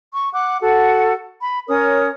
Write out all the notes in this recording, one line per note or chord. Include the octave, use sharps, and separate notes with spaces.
C#6
F#5 D6 F#6
F#4 A4 F#5
B5
C#4 A#4 C#5 D#6